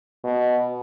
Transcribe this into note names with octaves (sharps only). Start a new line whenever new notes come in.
B2